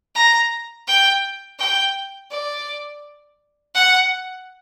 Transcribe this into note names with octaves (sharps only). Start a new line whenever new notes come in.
A#5
G5
G5
D5
F#5